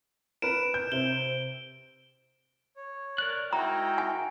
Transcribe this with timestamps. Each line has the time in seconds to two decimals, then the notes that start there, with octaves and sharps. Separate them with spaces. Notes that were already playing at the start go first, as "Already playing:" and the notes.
0.42 A#4 B4 D7 E7
0.74 G6
0.92 C3 C4 G7
2.77 C#5
3.18 A#4 D5 F#6
3.53 G#3 D#4 E4 F#4 A#4 G5 A#5
3.98 G#5